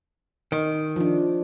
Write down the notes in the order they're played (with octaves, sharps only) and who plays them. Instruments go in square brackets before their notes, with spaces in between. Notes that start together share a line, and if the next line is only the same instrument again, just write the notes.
[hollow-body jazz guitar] D#3
[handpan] F3 D4